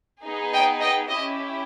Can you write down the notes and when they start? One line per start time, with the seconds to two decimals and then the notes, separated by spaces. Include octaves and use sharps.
0.24 B3 D#4 G#4
0.53 D#5 G5
0.81 D#5 G5
1.09 C#4 E4 G4 D#5